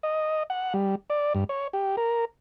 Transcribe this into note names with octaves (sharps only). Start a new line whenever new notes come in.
D#5
F#5
G3
D5
G2
C#5
G4
A#4